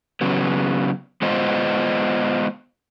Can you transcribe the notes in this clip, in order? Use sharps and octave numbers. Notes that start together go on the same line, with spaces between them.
C#3 F#3 B3
G#3 B3 F4 C5 D#5